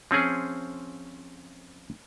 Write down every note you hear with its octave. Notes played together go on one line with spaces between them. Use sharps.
F3 C4 C#4 G#4